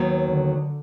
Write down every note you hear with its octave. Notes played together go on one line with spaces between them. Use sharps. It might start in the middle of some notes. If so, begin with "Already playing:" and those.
Already playing: D#2 D#3 F#3 B3
D3